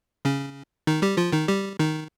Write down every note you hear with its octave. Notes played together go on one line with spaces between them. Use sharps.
C#3 C#4
D#3 D#4
G3 G4
F3 F4
D#3 D#4
G3 G4
D#3 D#4